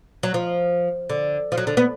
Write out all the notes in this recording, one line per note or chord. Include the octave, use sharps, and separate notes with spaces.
F#3
F3
D3
F3
F#3
D3
B3